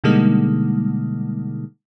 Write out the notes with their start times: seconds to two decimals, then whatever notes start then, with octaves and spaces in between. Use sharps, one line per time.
0.04 B2 D3 G3 G#3 A#3 D#4